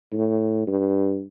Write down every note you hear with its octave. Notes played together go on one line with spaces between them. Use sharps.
A2
G2